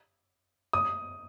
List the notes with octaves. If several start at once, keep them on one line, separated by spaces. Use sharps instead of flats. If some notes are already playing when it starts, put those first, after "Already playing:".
D#6